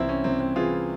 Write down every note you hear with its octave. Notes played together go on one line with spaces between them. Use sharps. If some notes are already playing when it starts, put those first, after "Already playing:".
Already playing: C2 E3 C4 E4
C#4
C2 C4
C4
E3 F4 G#4